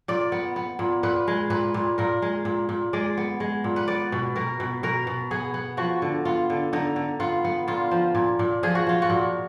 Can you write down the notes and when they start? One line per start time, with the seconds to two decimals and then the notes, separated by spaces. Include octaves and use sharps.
0.08 A#2 D5
0.32 B3
0.56 B3
0.79 A#2
1.03 A#2 B4
1.28 G#3
1.50 A#2 B4
1.74 A#2
1.98 A#2 A#4
2.22 G#3
2.45 A#2
2.69 A#2
2.93 G#3 D5
3.17 B3
3.40 G#3
3.64 A#2
3.76 B4
3.88 B3 D5
4.12 B2
4.36 B2 A#4
4.60 B2
4.83 B2 A#4
5.07 B2
5.31 B3 G#4
5.54 B3
5.77 F3 F#4
6.02 D3
6.25 B3 F4
6.50 D3
6.73 D3 D#4
6.96 D3
7.20 B3 F4
7.45 B3
7.68 A#2 F4
7.91 F3
8.15 A#2
8.39 A#2
8.63 F3 G#4
8.75 F#4
8.87 F3 F4
9.02 F#4
9.10 A#2